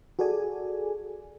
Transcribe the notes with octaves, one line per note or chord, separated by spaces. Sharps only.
F#4 G#4 A4 D5 G#5